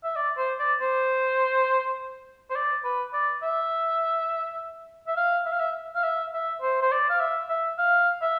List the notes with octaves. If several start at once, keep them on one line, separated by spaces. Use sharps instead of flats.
E5
D5
C5
D5
C5
C5
D5
B4
D5
E5
E5
F5
E5
F5
E5
F5
E5
E5
C5
C5
D5
F5
E5
E5
F5
E5